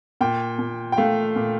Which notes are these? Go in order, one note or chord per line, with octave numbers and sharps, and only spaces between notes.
A#2 G5
A#2
G5
A3 F5
A#2